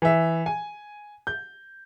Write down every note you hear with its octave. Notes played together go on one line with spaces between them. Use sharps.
E3 E5
G#5
G6